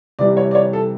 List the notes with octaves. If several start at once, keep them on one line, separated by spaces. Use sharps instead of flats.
C3 E3 G3 D5
C#5
D5
C#5
A4